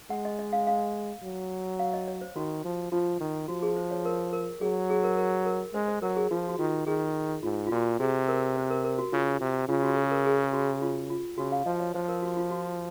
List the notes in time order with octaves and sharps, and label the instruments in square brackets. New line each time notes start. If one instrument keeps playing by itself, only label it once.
[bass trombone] G#3 [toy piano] F#5
[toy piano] D#5
D#5
F5
F5
[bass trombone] F#3
[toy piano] F5
D#5
C#5
C5
[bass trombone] D#3 [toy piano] F#4
[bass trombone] F3
[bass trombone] F3 [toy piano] F4
[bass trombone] D#3
[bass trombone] F3 [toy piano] F#4
[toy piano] G#4
C5
C#5
A#4
A#4
[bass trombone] F#3 [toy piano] G#4
[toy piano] G#4
A#4
A#4
A#4
[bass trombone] G#3 [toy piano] C5
[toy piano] C5
[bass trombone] F#3 [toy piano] A#4
[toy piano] G#4
[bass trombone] F3 [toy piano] F4
[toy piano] F#4
[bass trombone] D#3 [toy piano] F4
[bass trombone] D#3 [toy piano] G#4
[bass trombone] G#2 [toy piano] F4
[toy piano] F4
[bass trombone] A#2 [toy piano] F#4
[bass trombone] C3 [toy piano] G#4
[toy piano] A#4
C5
A#4
A#4
F#4
[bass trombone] C#3 [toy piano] F4
[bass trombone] C3
[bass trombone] C#3 [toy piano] F4
[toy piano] F#4
G#4
A#4
G#4
F#4
F4
F4
[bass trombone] C#3 [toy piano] F#4
[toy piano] F5
[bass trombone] F3 [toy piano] D#5
[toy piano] C#5
[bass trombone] F3 [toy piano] C5
[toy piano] A#4
F#4
F4
F#4